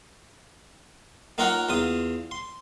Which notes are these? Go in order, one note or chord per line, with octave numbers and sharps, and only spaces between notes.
A#3 D#4 F4 A#4 C#5 F#5
E2 F4 D#6
C6